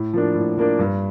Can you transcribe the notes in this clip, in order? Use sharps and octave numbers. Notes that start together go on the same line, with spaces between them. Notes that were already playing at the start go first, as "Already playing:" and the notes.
Already playing: A2
F3 A#3 D4
A2
F3 A#3 D4
G2